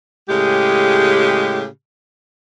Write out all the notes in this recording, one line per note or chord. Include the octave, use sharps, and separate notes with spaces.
A2 C#3 G#3 G4